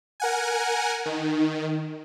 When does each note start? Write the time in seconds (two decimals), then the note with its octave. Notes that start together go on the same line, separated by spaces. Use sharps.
0.20 A#4 F#5 G#5
1.06 D#3